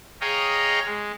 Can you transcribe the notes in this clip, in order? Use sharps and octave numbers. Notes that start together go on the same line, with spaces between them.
G#4 C#5 D#5 F5 G5 A#5
G#3